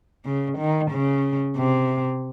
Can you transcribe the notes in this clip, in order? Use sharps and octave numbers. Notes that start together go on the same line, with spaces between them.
C#3
D#3
C#3
C3